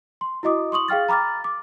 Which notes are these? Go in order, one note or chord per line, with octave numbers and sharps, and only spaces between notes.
C6
E4 F#4 D#5 D6 D#6
C6 C#6 D#6 F#7
G#4 F5 G5 F6 A6
A#5 B5 D6 F6 A6
D6